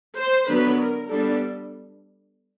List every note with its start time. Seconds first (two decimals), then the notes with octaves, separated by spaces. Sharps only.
0.16 C5
0.47 D3 F#3 B3 D4 B4
0.77 A#4
1.09 G3 B3 D4 A4